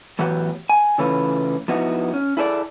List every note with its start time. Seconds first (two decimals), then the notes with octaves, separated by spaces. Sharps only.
0.19 A2 E3 F#3 B3 F#4 G4
0.70 G#5
0.98 C#3 E3 A3 C#4 F4 B4
1.68 F3 B3 D#4 E4 F#4
2.14 C#4
2.37 E4 G#4 A4 C#5 D5